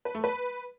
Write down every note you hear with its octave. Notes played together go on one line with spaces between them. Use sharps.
B4
A3
B4